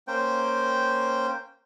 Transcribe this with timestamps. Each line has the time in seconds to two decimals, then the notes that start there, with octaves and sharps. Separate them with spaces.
0.08 A#3 C#4 C5 G5